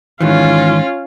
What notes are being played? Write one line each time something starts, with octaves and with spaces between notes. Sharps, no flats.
G#2 D#3 E3 C#4 F4